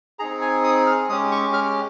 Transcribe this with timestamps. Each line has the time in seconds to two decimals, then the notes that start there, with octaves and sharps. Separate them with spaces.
0.19 C4 D#4 G#4 A#5
0.41 G#5
0.64 D#6
0.87 F6
1.09 G#3 C#4 G4 D#6
1.32 C#6
1.53 F6